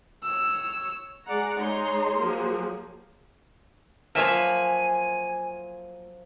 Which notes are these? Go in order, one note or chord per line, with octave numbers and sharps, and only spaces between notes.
C#5 E6
G#3 G#4 D5 F#5 A#5
G#3 D#4 G#4 C#5 A#5 C6
F3 F#3 A#3 G#4
F3 F#3 A#3 F4 C#5 E5 G#5